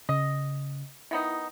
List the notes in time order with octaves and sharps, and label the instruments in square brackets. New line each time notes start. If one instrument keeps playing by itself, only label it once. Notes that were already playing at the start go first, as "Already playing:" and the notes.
[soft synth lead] C#3 [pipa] D#5
[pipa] D#3 B3 D#4 [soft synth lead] E4